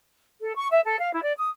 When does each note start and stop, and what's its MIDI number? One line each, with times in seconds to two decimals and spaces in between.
0.40 0.52 69
0.56 0.67 85
0.70 0.79 76
0.85 0.96 69
0.99 1.10 77
1.12 1.23 64
1.23 1.32 74
1.37 1.49 87